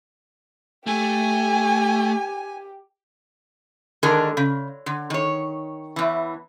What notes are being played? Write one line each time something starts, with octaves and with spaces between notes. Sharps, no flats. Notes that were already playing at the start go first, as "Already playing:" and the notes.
A3 G4 G#5
G#2 D3 D#3 D4 G#4 A#4
C#3
D3
D#3 C#5
E2 E3